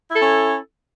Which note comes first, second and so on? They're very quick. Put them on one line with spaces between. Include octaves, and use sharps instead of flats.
E4 A4 C#4